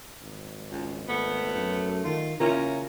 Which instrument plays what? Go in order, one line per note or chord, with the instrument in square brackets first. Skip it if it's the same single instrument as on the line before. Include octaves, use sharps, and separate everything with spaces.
[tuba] G#1
[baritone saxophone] C#2
[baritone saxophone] A3 [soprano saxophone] B3
[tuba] F#2
[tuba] D#3 [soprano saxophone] F4
[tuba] C#3 [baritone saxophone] C#4 [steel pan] E4 F4 A#4 [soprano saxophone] A#5